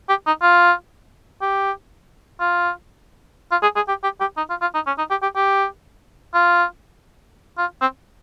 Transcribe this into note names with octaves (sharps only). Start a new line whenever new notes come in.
G4
D#4
F4
G4
F4
F4
G#4
G#4
G4
G4
G4
D#4
F4
F4
D#4
C#4
D#4
G4
G4
G4
F4
F4
C4